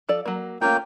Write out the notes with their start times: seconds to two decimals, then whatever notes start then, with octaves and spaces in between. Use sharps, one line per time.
0.09 F3 A4 D5
0.26 F#3 A#3
0.62 A3 A#3 C#4 F4 G5